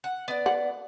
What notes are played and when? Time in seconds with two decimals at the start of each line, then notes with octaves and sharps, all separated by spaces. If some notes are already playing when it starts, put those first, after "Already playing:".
0.04 F#5
0.28 B3 D5
0.46 F#5